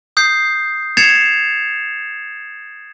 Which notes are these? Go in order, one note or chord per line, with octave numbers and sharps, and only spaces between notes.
D#6 G6 C7
G#6 A6 C7 C#7 E7 F7